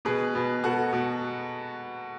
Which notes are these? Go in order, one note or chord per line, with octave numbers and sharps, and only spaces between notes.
B2 G#4 B4
B2
B2 F#4 A4
B2